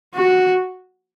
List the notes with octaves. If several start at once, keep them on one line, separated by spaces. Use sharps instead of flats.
F#4